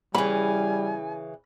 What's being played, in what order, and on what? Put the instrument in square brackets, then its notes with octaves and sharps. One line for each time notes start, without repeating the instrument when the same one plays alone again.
[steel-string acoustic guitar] C#3 E3 [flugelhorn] G3 [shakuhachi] G#5 [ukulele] B5